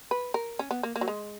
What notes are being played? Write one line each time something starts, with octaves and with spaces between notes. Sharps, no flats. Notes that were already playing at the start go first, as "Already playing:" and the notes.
B4
A#4
C#4
B3
A#3
A#3
F#3
G#3